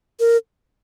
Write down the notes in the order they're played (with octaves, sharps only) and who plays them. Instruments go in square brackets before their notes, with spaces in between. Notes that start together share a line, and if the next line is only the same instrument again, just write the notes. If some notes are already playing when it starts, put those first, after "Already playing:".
[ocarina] A#4